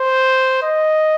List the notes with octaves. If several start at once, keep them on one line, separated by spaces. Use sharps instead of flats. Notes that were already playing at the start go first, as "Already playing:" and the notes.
Already playing: C5
D#5